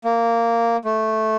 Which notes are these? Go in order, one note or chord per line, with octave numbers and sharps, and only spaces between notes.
A#3
A3